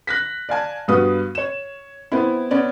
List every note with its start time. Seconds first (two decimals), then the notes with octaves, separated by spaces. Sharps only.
0.07 F#6 A#6 B6
0.49 D5 F5 G#5 A5
0.88 G2 B3 F#4 B4 F5 D#6
1.35 C#5 E7
2.12 B3 C4 E4
2.51 B3 C#4 D5